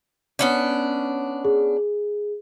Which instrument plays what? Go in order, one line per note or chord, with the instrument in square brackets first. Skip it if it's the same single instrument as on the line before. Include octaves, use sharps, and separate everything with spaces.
[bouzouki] B3 C#4 D4
[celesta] G#4